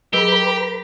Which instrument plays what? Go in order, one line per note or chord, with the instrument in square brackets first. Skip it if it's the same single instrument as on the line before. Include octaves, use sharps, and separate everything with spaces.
[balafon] F#3 G#4 [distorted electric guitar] G4 [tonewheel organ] A#4 B4 B5